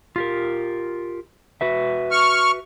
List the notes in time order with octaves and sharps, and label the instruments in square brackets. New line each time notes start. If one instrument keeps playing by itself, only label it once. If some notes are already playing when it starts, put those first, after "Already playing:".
[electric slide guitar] F4 G4 A#4
F#4 B4 E5
[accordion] C#6 F6